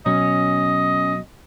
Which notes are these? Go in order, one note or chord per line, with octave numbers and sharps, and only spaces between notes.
B2 F#3 C#4 D#5